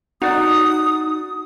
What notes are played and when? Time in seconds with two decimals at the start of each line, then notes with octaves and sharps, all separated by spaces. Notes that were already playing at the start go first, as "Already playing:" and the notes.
0.22 D#4 F#4 D5 D#6